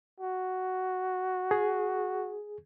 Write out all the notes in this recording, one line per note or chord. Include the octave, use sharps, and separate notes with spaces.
F#4
G#4